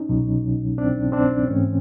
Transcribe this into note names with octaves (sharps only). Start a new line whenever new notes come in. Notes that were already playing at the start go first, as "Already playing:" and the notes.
Already playing: C#4 D#4
C2 B2 F#3
C4 D4
C4 D4
G#2 E3 A3 C4 C#4